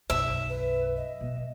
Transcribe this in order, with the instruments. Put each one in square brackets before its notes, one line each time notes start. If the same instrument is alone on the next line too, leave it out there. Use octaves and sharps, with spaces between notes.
[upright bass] B1 F#2 [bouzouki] E5
[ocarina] B4
D#5
[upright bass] B2